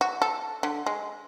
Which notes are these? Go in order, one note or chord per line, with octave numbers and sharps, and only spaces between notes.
F#4
A4
D3
G#3